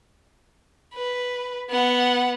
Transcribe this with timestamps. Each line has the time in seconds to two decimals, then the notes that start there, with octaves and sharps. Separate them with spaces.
0.94 B4
1.70 B3 F#5